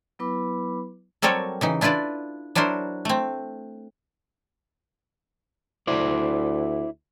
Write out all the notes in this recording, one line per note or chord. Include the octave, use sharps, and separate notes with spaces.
F#3 B3 E4 B4 B5 D6
F#3 G3 C4 A4 A#4 C#5
C#3 E3 D#4
D4 E4 F4 B4 D5
F#3 D4 E4 A#4 C5
A3 C4
D2 E4 C5 D5